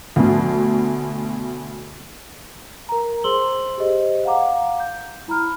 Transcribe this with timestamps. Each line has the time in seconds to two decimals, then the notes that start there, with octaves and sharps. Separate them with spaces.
0.16 D2 B2
2.89 A#4 A#5
3.24 G#4 C5 C6 E6 F#7 G7
3.78 G4 G#4 C5 D#5
4.25 F5 F#5 A#5 D6
4.80 G6
5.28 E4 A#5 B5 F6